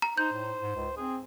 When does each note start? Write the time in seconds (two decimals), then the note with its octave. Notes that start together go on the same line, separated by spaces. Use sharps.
0.02 A#5
0.17 D#4 C5 G6
0.33 A2
0.61 G#2
0.76 C#2
0.97 C4 G#4